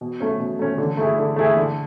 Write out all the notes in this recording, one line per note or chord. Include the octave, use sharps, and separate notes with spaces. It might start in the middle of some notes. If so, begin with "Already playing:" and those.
B2
A3 C#4
B2
A3 C#4
D3
A3 E4 G#4
D3
A3 E4 G#4
D3